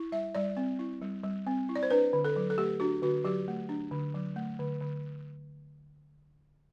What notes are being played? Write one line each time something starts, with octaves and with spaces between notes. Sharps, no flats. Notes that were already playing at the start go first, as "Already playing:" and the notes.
Already playing: E4
G3 E5
G3 D5
C4
E4
G3
G3
C4
E4
D5
C5
D4 B4
D3
A4
F#3
A4
A3 G4
D4 F#4
D3 F#4
F#3 G4
A3
D4
D3
F#3
A3
D3
D3